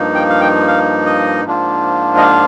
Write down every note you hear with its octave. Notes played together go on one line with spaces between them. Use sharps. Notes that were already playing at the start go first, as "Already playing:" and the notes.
Already playing: G2 F3 A#3 D#4
G5
F5
G5
F5
D#5
G#2 F3 A#3 D4 F4
D#5
F5